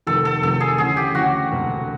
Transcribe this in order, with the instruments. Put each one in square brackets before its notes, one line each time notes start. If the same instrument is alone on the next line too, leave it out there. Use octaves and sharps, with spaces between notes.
[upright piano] F1 F2 C3 D#3 [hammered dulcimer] A4
[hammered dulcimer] A4
[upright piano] F1 F2 C3 D#3 [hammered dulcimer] A4
[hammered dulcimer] G#4
[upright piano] D2 C#3 E3 [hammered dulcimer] G#4
[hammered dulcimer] G4
[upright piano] D2 C#3 E3 [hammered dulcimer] F#4
[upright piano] E1 D2 C3